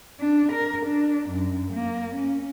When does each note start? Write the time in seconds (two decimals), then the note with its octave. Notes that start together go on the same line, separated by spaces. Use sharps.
0.20 D4
0.52 A#4
0.86 D4
1.29 F#2
1.73 A#3
2.15 C#4